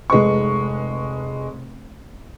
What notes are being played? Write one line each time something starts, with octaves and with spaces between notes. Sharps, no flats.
F1 G#3 B4 C#6